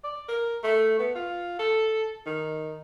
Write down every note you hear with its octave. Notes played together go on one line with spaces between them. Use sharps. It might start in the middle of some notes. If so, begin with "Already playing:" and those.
D5
A#4
A3
B3
F4
A4
D#3